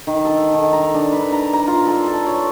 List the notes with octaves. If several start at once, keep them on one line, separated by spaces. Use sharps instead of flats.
D#3
A4
D#3
A#5
D4
B4
A#5
A#5
F4
A4
A4
C#5